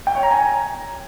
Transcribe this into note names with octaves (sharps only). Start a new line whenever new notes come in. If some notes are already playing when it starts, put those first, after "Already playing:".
G5
C#5
A#5
G#5